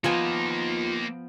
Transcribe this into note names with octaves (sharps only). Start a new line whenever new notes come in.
F3 A#3 B3 D#4 F4 G#5